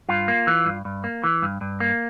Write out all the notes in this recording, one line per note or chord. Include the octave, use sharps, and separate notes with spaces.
G2 F4
A#3
E3
G2
G2
A#3
E3
G2
G2
A#3